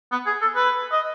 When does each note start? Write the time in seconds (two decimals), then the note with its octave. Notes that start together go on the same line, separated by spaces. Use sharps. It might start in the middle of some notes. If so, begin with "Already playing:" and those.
0.12 B3
0.26 G#4
0.41 A4
0.55 B4
0.92 D#5